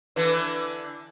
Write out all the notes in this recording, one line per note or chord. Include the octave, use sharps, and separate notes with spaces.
D3 E3 B4